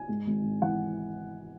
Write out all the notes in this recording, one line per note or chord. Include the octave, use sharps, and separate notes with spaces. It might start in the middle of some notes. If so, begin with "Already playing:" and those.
Already playing: G#5
G#2
G#1
G#1
E3 F#5